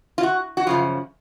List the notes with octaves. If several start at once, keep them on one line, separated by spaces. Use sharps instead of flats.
F4
F#4
F#4
F#2 C#3 F3 F4